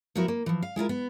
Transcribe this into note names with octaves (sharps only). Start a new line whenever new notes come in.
F3 B3 E4 F#4 A#4
A#3
E3 F3
F5
G#3 E4 F4 A#4
B3